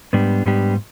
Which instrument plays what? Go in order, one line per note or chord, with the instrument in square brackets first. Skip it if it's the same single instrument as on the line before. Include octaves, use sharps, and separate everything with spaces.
[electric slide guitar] G#2 G3 B3 D4 G4
G#2 G3 B3 D4 G4